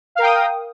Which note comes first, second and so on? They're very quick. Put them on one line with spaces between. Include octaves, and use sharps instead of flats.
F5 A#4 G5 D#6